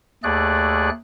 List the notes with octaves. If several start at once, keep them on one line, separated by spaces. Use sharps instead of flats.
D#2 A3 G#4 D5 F#6